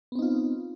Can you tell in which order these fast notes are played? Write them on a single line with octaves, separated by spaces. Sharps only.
B3 C4 D#4 F4